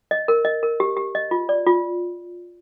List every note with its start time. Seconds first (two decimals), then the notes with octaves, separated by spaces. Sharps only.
0.11 D#5
0.28 A#4
0.45 D#5
0.63 A#4
0.80 G4
0.97 G4
1.15 D#5
1.31 F4
1.49 D5
1.66 F4